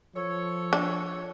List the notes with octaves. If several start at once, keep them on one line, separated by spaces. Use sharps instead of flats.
F3 A4 C#5
D4